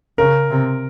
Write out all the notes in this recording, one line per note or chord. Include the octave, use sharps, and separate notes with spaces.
C#3 A#4
C3